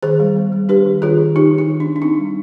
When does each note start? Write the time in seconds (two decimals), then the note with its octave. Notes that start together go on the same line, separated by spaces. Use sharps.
0.03 D#3 G#4 C5
0.20 G3
0.36 B3
0.52 G3
0.69 D4 G4 B4
0.86 D#3
1.02 D#3 F4 G#4
1.19 D#3
1.36 D#3 D#4 G4
1.53 D#3
1.58 D#4
1.69 D#3
1.80 B3 D4
1.96 D4
2.02 C4 D#4
2.18 G3